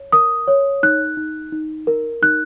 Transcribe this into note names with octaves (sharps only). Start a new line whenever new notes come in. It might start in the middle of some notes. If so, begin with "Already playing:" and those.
Already playing: C#5
A#4 D#6
C#5
D#4 F#6
D#4
D#4
A#4
D#4 F#6